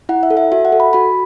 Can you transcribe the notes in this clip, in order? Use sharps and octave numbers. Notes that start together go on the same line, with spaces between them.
E4 F#5
E5
A4
E5
F#4 E5
F#5
A4
B5
F#4 B5